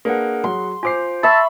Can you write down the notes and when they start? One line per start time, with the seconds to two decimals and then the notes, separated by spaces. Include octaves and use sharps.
0.05 A#3 D4 G#4 B4 F#5
0.44 F#3 C6
0.83 F4 C5 G#5 D6 C7
1.23 E5 A5 B5 C#6 E6